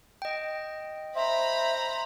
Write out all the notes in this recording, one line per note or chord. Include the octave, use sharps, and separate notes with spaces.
D#5 G5
C5 E5 A#5 B5